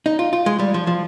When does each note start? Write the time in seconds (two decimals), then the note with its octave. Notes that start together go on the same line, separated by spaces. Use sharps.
0.06 D#4
0.19 F4
0.33 F4
0.46 G#3
0.59 G3
0.74 F3
0.87 F3